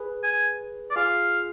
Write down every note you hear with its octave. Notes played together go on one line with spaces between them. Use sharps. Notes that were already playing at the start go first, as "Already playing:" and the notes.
Already playing: G#4 B4
G#5
D5
F4 G#4 F5